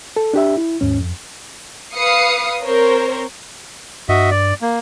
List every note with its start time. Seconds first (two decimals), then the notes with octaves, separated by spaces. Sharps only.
0.16 A4
0.34 D4 G4 E5
0.57 E4
0.81 D#2 G#2 C#4
1.01 F2
1.96 B4 F5 D#6 C7 C#7
2.65 C4 A#4 C5 C#5
4.09 G2 F#4 D#5 E5
4.31 D5
4.62 A#3